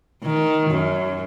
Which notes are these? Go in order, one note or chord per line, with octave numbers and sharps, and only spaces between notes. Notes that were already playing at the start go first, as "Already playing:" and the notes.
D#3
F#2